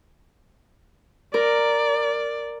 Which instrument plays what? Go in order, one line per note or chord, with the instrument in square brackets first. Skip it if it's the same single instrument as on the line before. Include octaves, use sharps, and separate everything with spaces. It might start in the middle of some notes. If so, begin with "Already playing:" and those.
[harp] A#4 [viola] D5